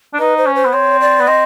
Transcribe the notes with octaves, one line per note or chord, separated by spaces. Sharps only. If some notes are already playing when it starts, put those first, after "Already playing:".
D4
D#4 B4
C5
C#4
C5
B3
C4 C#5
D5
B3
C4 D#5